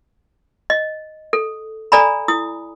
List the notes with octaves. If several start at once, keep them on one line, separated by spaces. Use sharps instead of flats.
D#5
A4
A4 D5 G#5 A#5 B5
E4 D#6